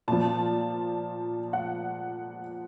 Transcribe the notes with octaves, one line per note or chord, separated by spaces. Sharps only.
A#2 F3 A5
F#5